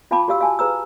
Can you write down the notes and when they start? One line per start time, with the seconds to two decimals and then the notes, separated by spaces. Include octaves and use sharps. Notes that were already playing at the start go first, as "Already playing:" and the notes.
0.11 F4 F5 G5 A5 B5 D6
0.28 F#4 G4 F5 E6
0.41 F5 G#5 A5
0.59 G#4 B4 A#5 E6